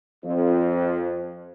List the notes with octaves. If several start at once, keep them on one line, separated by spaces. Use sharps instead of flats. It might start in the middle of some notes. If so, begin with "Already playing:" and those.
F2